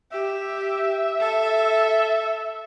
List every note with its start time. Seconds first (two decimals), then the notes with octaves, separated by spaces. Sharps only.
0.12 G4 E5
1.19 A4